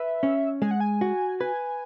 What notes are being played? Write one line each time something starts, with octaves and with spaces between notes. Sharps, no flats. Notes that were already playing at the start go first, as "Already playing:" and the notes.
Already playing: B4 E5
C#4
G#3 G#5
F#5
G#5
F#4
B4 G#5